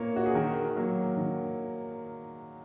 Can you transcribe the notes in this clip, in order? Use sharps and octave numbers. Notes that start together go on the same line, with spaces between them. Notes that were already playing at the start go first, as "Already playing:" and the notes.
Already playing: A#2 A#3 C#5
F#4
G#4
D#3 A#4
F#3 A#3
D#3